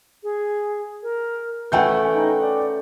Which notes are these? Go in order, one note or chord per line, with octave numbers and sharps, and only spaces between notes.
G#4
A#4
E3 A3 C#4 B4 F#5 G5 G6
D#4
D5